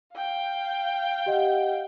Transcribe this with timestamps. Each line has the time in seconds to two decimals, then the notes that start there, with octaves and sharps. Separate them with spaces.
0.15 F5 G5
1.26 G4 D#5 F#5